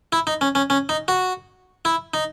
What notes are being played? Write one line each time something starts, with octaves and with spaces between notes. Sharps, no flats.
E4
D#4
C#4
C#4
C#4
D#4
F#4
E4
D#4